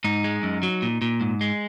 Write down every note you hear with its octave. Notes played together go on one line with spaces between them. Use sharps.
G#2 D#4
G#3
F#2
F#3
A#2
A#2
G#2
G#3